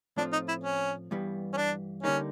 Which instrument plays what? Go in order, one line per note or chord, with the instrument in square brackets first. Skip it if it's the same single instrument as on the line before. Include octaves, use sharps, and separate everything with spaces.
[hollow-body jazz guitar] A2 F3 A3 C4 F4 [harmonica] D4
[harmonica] D#4
E4
C#4
[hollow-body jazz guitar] G2 E3 G3 B3
[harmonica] C#4
D4
[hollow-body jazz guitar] D3 G3 A#3 D#4 [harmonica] C#4